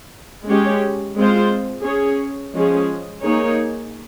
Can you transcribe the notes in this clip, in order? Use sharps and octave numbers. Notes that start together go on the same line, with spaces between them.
G#3 C#4 G4 C#5
G#3 C4 F4 C5
C#4 G#4 C#5
F3 G#3 C#4 G#4
A#3 D#4 G#4 C#5